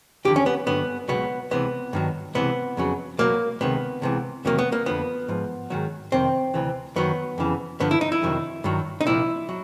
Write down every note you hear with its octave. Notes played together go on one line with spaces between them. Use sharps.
D#2 D3 F3 G4
C#4
B3
G2 D3 F#3 B3
C#2 B2 F#3 B3
C#2 C3 E3 B3
G2 D#3 F#3
C#2 C3 E3 B3
F2 C#3 F#3
C#2 B2 F#3 A#3
C#2 C3 D#3 B3
C#2 C3 E3
E2 C3 D#3 F#3 A#3
B3
A#3
F2 D3 F3 B3
G#2 F3
G#2 D#3 F#3
F2 C3 D#3 C4
D2 C3 E3
F#2 D#3 F#3 B3
F2 C#3 E3
G2 D3 F3 B3
E4
D#4
E4
F2 C3 D#3 F#3
G2 D#3 F#3
D#4
C2 A#2 F3 E4
F#3